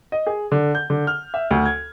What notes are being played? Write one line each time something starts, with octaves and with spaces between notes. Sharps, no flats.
D#5
G#4
D3
G6
D3
F6
E5
D2
G#6